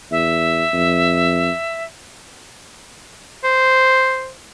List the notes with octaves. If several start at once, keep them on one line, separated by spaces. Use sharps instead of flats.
E2 E5
F2
C5